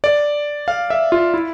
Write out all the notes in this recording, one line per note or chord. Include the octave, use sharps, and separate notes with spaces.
D5
F5
E5
F4
E4